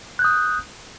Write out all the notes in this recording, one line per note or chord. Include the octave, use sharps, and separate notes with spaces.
D#6 F#6 G6